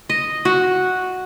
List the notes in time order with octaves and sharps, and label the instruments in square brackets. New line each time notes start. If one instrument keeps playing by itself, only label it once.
[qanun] D#5
F#4